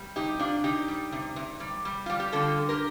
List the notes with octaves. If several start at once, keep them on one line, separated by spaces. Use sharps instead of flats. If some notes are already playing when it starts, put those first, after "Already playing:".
Already playing: G3
C3 D#4 G4
C3 D4 F4
C3 D#4 G4
G3
C3
C3
G3
G3
G3 F4
G4
D3 F4 A4
D3
G4 A#4